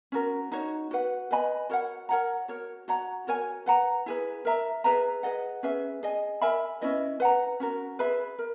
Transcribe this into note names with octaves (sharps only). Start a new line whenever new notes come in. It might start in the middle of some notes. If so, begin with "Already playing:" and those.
C#4 F#4 A#4
D#4 F#4 C#5
F#4 B4 F#5
B4 D#5 G#5 B5
F#4 A#4 C#5 F#5
A#4 C#5 F#5 A#5
F#4 A#4 C#5
F#4 C#5 F#5 A#5
F#4 A#4 C#5 G#5
B4 F#5 A#5
E4 G#4 B4
A#4 E5 A#5
G#4 B4 E5 A#5
G#4 B4 D#5 F#5
C#4 G#4 B4 E5
G#4 D#5 G#5
A#4 E5 G#5 B5
C#4 E4 B4 D#5
B4 F#5 A#5
C#4 F#4 A#4
G#4 B4 E5 B5
A#4